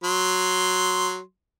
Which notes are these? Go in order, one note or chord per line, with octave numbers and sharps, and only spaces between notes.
F#3 C6